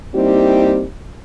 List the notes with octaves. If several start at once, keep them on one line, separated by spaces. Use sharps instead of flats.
G3 A#3 C4 D#4 E4 G4